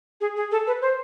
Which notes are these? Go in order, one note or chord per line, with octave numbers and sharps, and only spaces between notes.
G#4
G#4
A4
B4
C5